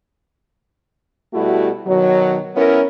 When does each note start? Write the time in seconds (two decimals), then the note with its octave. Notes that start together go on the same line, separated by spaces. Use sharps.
1.34 B2 G3 A3 E4 F#4
1.87 B2 D#3 F#3
2.55 B3 C#4 E4 A#4